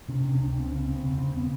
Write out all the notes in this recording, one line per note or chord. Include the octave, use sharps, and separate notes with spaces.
C3 C#4
C#4
C3 D4
C#4
C#2 D4
C#2 C4
C#3 C#4
C#3 C4
E1 C4
C#3 C4
B3